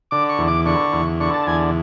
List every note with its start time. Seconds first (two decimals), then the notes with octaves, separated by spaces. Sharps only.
0.11 D3 D6
0.29 C#6
0.38 E2
0.48 D6
0.66 D3 C#6
0.93 E2
1.20 D3 C#6
1.34 A5
1.47 E2 G#5